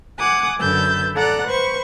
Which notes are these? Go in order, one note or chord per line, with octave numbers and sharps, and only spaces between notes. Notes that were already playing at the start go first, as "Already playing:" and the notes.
F#5 G#5 D6 D#6 F#6
F#2 D3 B4 E6 G6 A6
A4 D5 F#5 A#5 F#6
B4 C5 C#6